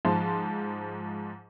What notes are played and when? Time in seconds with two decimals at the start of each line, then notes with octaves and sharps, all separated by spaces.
0.05 G#2 F3 A5 C6